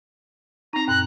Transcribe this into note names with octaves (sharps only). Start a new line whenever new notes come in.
C4 D#4 A#5
F#2 A#2 F#6